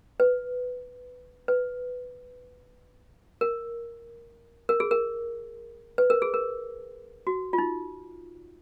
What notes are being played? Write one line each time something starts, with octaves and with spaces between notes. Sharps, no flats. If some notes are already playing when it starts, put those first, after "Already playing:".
B4
B4
A#4
A#4
G#4
A#4
B4
A#4
G#4
A#4
F#4
F4
D#4